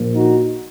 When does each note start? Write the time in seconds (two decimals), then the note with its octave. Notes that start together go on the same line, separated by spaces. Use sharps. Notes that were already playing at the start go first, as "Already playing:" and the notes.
Already playing: A#1 A#2 F3
0.15 D#4 F#4